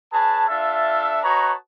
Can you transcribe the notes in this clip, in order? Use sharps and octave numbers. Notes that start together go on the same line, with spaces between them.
C#4 G#4 B4 A5
D4 F4 A4 E5
F#4 B4 C#5 D#5 A5 A#5